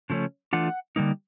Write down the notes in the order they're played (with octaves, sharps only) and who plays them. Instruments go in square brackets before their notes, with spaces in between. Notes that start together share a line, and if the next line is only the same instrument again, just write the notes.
[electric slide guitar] C#3 F3 A3 C#4
E3 A3 D4 F4 F#5
D3 G3 A#3 D#4